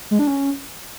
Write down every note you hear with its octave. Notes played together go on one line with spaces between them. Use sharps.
G#3
D4
C#4